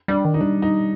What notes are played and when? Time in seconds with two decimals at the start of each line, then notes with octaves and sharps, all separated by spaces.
0.08 G3 D4
0.25 D#3
0.34 D#4
0.41 G3 D4
0.62 D#4